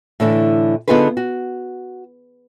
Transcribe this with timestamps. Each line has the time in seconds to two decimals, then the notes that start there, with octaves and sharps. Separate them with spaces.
0.20 A2 D3 E3
0.88 D3 B3 D#4 F4 G#4 B4
1.17 F#4